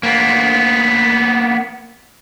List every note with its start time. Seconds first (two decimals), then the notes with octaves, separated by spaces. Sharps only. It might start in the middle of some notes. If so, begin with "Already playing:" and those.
0.03 A#3 B3